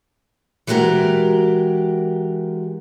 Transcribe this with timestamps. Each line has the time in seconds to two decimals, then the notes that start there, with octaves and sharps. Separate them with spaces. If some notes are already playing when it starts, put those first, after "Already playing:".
0.67 E3 G#3 F#4 G4 A#4